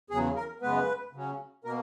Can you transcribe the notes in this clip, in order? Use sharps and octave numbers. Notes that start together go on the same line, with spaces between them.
E2 C#3 F#3 G#4
A#4
F#2 C#3 G#3 B3 B4
C#3 F#3 C#4
B2 A#3 A#4